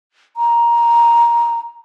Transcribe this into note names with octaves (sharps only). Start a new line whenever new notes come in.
A#5